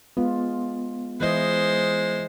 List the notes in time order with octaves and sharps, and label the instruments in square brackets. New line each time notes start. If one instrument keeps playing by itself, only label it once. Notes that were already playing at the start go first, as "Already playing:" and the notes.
[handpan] G#3 F4 [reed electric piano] B3
[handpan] E3 E4 D#5 [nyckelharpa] G#3 C5